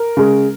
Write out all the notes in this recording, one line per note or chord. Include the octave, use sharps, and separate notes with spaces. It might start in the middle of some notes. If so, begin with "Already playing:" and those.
Already playing: A#4
C#3 G#3